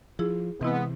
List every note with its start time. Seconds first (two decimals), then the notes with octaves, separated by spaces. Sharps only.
0.19 F3 E4 G#4
0.61 C3 E3 G#3 B3 C4 E4